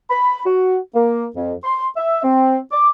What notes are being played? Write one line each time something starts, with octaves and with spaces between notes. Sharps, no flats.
B5
F#4
A#3
F2
C6
E5
C4
D6